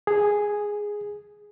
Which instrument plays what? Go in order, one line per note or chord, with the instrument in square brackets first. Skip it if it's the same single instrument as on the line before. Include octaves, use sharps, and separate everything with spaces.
[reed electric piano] G#4